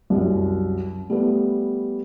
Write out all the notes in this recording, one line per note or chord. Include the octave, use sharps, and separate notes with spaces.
C2 F#2
G3 A3 B3